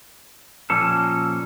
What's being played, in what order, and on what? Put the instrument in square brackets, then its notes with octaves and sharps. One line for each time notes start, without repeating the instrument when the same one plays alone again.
[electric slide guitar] A#2 F3 A#3 C#4 A4